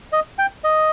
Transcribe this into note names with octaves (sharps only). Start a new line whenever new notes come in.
D#5
G5
D#5